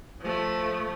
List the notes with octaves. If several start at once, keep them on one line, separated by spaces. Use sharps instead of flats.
F3 A3